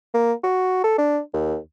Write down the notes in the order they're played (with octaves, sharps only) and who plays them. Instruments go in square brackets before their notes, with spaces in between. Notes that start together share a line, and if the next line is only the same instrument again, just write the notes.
[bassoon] A#3
F#4
A4
D4
D#2